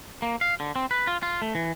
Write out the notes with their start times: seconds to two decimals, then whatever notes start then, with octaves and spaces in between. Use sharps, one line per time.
0.22 A#3
0.41 F5
0.60 D3
0.76 C4
0.91 B4
1.07 F4
1.23 F4
1.42 A3
1.55 E3